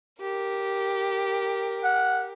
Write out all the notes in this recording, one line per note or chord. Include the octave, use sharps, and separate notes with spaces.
G4 A#4
F#5